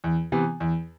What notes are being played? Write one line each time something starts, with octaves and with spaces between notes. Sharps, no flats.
E2
C3 E3 B3
E2